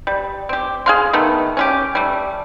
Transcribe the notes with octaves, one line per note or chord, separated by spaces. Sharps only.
G3
C4 G4
G#4 F5 C6
D#3 A3 B3
C#4 F4 G4
G3 A3